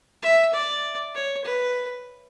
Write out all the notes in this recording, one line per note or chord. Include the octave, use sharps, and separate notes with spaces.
E5
D5
C#5
B4